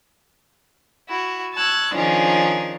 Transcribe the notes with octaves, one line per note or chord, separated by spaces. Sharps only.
E4 F#4
A5 C#6 E6 F#6 G#6
D#3 F3 C#4 D4 G#4 A#4